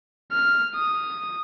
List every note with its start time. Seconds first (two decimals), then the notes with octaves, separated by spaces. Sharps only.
0.32 F6
0.75 D#6